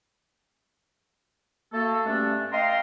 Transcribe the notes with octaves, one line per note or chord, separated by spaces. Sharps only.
A3 A#3 F#4 A4
G2 A3 C#4 D4
D#5 F5 G5 A#5 C6